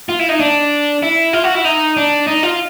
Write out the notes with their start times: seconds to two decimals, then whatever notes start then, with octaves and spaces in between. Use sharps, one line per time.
0.09 F4
0.19 E4
0.29 D#4
0.40 D4
1.03 E4
1.33 F4
1.44 F#4
1.55 E4
1.65 D#4
1.97 D4
2.27 D#4
2.43 F4